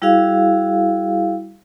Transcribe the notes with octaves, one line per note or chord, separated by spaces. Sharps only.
G3 E4 F#4 G#4 F5